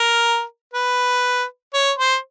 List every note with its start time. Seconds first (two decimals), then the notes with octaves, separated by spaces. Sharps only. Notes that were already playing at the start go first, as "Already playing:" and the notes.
Already playing: A#4
0.73 B4
1.73 C#5
1.98 C5